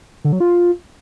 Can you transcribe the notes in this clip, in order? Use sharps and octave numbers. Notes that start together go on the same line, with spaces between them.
D3
F#3
F4